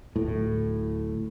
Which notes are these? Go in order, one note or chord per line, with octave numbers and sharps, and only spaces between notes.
D1 A2